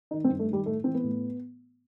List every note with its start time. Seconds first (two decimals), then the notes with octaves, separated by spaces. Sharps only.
0.11 D#3 D#4
0.24 C4
0.29 G2
0.39 A3
0.49 D#3 G3
0.66 A2 A3
0.84 E3 C4
0.94 B3
1.03 A2